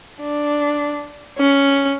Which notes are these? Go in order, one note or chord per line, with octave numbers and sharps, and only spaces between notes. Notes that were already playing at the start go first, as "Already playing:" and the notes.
D4
C#4